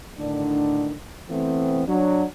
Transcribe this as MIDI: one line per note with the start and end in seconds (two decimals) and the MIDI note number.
0.19 0.93 45
0.19 0.93 50
0.19 0.93 51
0.19 0.93 62
1.29 1.83 52
1.29 1.83 57
1.29 1.83 59
1.29 1.83 60
1.87 2.24 54
1.87 2.24 62